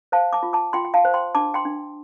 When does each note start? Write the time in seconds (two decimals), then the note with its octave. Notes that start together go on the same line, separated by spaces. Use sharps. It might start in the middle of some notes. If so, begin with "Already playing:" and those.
0.12 C5 F5 A5
0.33 A5 D6
0.43 F4
0.53 A5 D6
0.73 F4 G5 C6
0.85 G5
0.94 F5 A5
1.05 C5
1.14 G5 C6
1.35 D4 A5 D6
1.54 G5 C6
1.65 D4